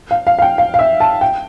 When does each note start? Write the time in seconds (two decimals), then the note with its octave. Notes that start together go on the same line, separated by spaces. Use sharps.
0.11 F5
0.27 F5
0.39 F5
0.42 G5
0.58 F5
0.74 F5
0.79 E5
1.00 A5
1.21 G5